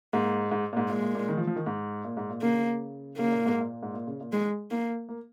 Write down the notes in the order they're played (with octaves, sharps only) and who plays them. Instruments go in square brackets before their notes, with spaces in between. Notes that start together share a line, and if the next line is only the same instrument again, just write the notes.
[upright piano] G#2 [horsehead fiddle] A#3
[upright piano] G#2
A#2
G#2
[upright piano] A#2 [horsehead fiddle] G#3
[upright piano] A#2
A#2
D#3
F3
F3
D#3
G#2
A#2
G#2
A#2
[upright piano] C#3 [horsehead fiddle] A#3
[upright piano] C#3 [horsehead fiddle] A#3
[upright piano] A#2
G#2
A#2
G#2
A#2
C#3
A#2
[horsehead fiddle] G#3
A#3
[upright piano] A#3